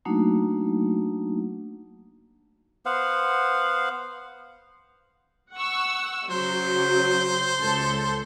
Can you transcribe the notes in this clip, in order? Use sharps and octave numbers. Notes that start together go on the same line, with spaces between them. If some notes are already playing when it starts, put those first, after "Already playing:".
F#3 A3 A#3 D4 D#4 F#4
B3 C5 F5 F#5
F#5 C#6 E6
C#3 F#3 C5
C#2 A4